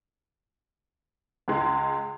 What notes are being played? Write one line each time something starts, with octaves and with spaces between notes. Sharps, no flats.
C#2 G#3